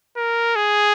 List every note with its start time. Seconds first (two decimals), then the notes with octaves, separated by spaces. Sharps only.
0.17 A#4
0.56 G#4